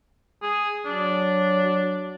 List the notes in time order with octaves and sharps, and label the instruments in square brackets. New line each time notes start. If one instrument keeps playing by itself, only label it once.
[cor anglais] G#4
[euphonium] F#3 [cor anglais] D4